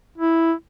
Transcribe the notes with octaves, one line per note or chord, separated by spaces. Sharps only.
E4